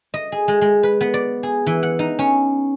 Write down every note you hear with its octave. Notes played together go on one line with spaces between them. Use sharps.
D#5
G#4
G#3
G#3
B4
B3
D5
G#4
E3
F#5
D#4
C#4